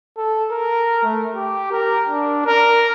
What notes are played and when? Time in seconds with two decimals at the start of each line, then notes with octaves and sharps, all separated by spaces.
0.17 A4
0.51 A#4
1.03 A3
1.35 G4
1.72 A#4
2.09 D4
2.46 A#4